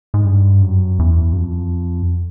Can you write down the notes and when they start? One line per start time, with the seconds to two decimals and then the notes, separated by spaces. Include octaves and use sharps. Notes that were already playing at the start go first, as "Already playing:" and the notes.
0.14 G#2
0.25 G2
0.62 F#2
0.99 E2
1.33 F#2
1.37 F2